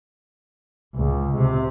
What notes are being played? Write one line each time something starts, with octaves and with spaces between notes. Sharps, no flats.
C#2
C3